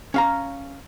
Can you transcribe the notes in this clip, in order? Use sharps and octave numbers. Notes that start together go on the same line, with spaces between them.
C#4 F5 A#5